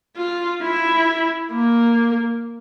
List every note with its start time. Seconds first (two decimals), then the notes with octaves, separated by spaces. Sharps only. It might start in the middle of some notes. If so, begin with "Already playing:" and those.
0.17 F4
0.62 E4
1.51 A#3